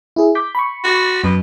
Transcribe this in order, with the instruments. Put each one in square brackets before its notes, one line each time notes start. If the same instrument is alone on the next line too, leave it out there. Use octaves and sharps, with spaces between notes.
[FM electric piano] E4 G#4
D6 G6 B6
B5 C#6
[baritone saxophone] F#4
[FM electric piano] F#2 [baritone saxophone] B2